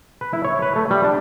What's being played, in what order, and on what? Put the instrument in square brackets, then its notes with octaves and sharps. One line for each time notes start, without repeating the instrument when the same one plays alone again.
[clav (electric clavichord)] B4
E4
C#5
B4
A3
G3
D4